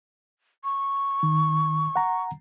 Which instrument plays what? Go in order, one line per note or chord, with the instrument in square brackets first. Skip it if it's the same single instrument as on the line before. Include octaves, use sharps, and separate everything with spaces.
[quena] C#6
[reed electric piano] D#3
F#5 A#5